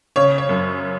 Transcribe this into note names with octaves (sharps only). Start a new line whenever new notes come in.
C#3 C#5
C#5
F#2